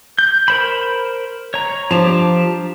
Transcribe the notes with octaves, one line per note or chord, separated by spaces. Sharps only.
G6
A#4 C5 B5
C#5 A#5
F3 D4 G4 A5 A#5